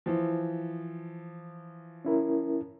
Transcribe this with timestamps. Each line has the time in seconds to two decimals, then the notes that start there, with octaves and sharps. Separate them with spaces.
0.06 E3 F3
2.05 C#4 E4 A#4